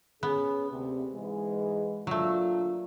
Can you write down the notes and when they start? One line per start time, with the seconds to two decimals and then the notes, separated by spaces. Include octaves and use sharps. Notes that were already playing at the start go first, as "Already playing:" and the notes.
0.23 B3 C#4 G#4
0.71 D2 C3
1.12 G#2 E3 G#3
2.07 F#3 A3 A#3 D4 F4